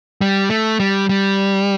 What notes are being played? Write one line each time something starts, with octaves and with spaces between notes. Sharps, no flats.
G3
A3
G3
G3